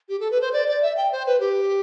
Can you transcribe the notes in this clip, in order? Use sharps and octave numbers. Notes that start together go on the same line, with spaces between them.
G4
A4
B4
C5
D5
D5
E5
G5
C5
B4
G4